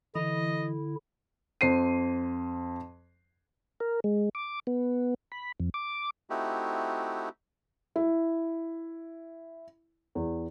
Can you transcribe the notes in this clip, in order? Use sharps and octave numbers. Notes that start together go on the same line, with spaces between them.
D3 E3 E4 D#5
F2 C5 C7 D#7
A#4
G#3
D6
B3
B5
F2
D6
A3 C4 D#4 E4 F#4 G4
E4
E2